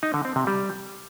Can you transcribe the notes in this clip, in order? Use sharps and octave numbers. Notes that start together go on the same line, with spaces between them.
D#4
D3
C4
C3
G3